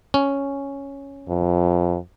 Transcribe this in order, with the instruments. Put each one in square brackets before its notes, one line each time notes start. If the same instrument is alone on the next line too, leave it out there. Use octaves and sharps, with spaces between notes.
[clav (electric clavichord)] C#4
[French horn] F2